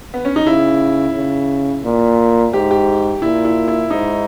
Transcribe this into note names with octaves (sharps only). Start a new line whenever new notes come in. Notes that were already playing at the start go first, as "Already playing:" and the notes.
B3
C#4
D#4
C#3 E4
C#3
A#2
G#2 G4
G4
A#2 E4
E4
E4
G#2 D#4